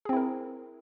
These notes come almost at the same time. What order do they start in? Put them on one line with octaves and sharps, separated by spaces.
G#4 C4 E4 A#4